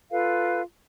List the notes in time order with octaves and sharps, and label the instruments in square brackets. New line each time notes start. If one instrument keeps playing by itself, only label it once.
[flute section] F4 A4 B4 F5